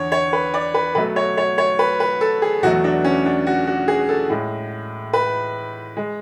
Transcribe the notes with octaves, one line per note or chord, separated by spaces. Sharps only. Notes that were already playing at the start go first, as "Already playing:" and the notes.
Already playing: E2 D3 C#5
C#5
B4
D5
B4
B2 F#3 A3 B4
C#5
C#5
C#5
B4
B4
A4
G#4
E2 B2 F#3 A3 F#4
D4
C#4
D4
F#4
F#4
G#4
A4
A2 G#3
B4
G#3